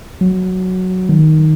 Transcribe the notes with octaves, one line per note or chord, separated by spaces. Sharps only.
F#3
D#3